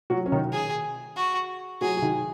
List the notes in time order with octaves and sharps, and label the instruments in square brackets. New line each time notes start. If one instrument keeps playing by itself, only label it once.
[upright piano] F#3 F#4
C#4
D#3 D#4
[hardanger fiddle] G#4
F#4
[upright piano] F#3 F#4 [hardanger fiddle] G#4
[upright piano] F#4
D#3 D#4